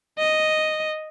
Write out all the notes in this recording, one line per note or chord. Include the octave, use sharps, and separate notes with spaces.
D#5